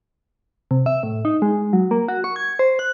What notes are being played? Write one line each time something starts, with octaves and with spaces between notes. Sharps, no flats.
C3
E5
A2
D#4
G#3
F#3
A#3
F#4
C#6
G#6
C5
F#6